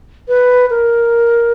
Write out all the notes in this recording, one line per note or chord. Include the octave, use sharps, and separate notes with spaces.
B4
A#4